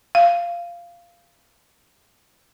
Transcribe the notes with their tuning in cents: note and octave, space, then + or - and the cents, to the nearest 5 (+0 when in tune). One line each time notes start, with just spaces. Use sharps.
F5 -10